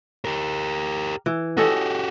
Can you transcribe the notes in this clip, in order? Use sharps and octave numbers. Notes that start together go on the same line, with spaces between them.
G4 A#4
E3
C#4 F#4 G4 A4 D#5